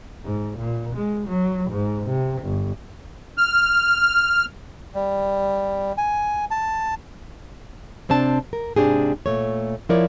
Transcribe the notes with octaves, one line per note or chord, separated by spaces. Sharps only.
G#2
A#2
G#3
F#3
G#2
C3
G1
F6
G3
G#5
A5
C3 C4 D4 A5
A#4
G#2 C3 E3 D4 G4 G#4
A#2 A3 C#5
F3 E4 A#4 C#5 D5